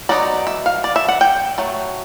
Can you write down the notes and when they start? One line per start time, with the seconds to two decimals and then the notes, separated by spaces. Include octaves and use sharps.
0.09 F#3 B3 D#4 D5
0.47 E5
0.66 F5
0.84 D5
0.96 E5
1.08 F#5
1.21 G5
1.58 F#3 A3